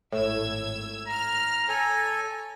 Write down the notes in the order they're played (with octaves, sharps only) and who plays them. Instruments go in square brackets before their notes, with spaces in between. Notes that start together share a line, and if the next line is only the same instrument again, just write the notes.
[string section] G#1 E6 G#6 [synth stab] A2
[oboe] A#5 [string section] F6
[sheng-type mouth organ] A4 G#5 [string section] C#5